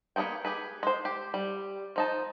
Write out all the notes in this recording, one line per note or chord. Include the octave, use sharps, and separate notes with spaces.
A#3 B3 G#4 C5 G5
G4 G#4 B4
G#3 C5
G4
G3
F3 D#4 A5